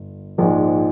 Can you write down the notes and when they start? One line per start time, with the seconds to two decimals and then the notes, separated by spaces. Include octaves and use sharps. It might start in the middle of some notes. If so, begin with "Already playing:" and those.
Already playing: G1
0.38 A#1 G#2 F3 G#3